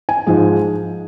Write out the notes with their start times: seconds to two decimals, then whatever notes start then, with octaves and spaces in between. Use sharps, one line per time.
0.09 G#5
0.27 G#2 F3 G#3